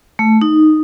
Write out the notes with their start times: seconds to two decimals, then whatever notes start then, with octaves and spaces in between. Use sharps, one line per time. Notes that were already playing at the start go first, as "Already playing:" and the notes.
0.19 A3
0.42 D#4